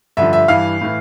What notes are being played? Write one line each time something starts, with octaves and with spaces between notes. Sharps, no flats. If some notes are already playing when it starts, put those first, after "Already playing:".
G2 D3 F3 E5
E5
G2 E3 F5
A2 E3